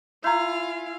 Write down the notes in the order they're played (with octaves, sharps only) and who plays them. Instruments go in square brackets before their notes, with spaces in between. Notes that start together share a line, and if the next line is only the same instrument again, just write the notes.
[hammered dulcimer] E4 G#5 [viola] F4 F5 [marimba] A#5 C6 G6